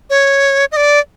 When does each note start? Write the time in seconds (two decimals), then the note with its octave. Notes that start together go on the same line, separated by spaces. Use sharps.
0.10 C#5
0.72 D#5
0.76 D5